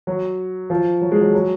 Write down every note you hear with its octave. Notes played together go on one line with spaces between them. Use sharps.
F#3
F3
F#3
G#3
F#3
F#3